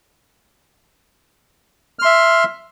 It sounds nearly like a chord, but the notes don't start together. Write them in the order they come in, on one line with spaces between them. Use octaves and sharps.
F6 C6 E5